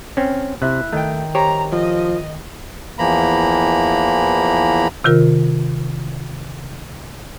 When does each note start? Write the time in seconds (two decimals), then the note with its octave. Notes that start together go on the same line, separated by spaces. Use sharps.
0.17 C4 C#4 F6
0.62 C3 E4 E5 F#6
0.93 D#3 A3 G5
1.35 G4 C5 C#5 A#5
1.72 F3 D#5
2.99 E2 E3 F3 A#3 A#5 B5
5.04 C3 D#3 F4 A#4